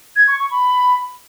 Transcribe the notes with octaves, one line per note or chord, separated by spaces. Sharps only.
G#6
C#6
C#6
B5